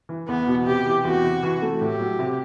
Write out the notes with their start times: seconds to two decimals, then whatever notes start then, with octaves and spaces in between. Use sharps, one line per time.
0.09 E3
0.28 E2 B3
0.47 B2
0.66 C3 G4
0.85 E3
1.05 E2 F#4
1.24 C3
1.43 E3
1.62 A3
1.81 A2 G4
2.00 F#3
2.19 C3